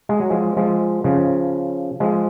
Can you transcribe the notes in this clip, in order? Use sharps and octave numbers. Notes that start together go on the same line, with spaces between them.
G#3
F#3
F3 G#3
F3 G#3
C#3 F3
F3 G#3